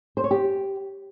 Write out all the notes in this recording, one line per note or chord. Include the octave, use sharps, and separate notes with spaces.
C5
C#5
G4